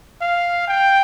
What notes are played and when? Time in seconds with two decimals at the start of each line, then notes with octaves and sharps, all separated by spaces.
0.21 F5
0.68 G5